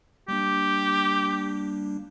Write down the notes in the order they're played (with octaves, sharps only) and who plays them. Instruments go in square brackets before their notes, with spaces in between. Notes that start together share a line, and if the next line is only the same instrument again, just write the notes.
[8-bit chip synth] G3 A#3 D4 [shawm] G4